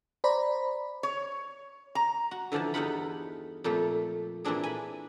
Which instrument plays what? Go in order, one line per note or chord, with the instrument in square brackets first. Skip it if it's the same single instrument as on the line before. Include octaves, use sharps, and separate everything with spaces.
[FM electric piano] C5 D5 A#5 B5
[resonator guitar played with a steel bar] C#5
A#5
[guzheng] F#4
D3 E3 F3 D5 A5
E2 G2 D#4 F4 F#5 B5
F2 A#2 F3 A3
A#2 E3 C4 D4 G#4
G#5 B5